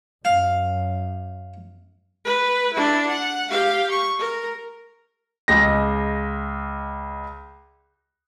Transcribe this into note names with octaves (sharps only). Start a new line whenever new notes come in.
F#2 F5
B4
D4 E4
F#5
G4 F5
C#6
A#4
C#2 G#3 A#6